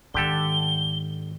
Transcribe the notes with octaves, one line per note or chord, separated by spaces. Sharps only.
G#2 D3 D#3 G4 A4 G7